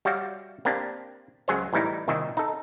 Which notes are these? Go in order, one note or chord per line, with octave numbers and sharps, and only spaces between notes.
G3 F#4 C#5 D5 E5 F5
A#3 C4 D4 G4
C#2 F#3 G#4 C5 C#5
A2 E3 G3 D#4 E4
C2 A#2 D#3 D#5 E5 G5
D#4 A4